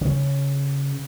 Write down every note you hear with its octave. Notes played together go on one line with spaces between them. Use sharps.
C#3